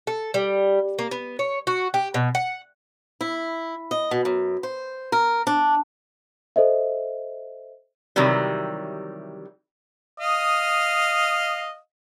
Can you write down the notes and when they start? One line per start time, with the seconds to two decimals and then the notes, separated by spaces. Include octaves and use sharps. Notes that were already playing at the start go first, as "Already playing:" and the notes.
0.07 A4
0.34 G3
0.99 A#3
1.11 B3
1.39 C#5
1.67 F#4
1.94 G4
2.14 B2
2.35 F#5
3.21 E4
3.91 D#5
4.11 B2
4.25 F#2
4.63 C5
5.12 A#4
5.47 D4
6.56 A4 C5 D#5 E5
8.16 C3 D#3 E3 F#3 G3
10.18 D#5 F5 D#6